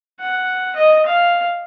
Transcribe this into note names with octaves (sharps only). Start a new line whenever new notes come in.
F#5
D#5
F5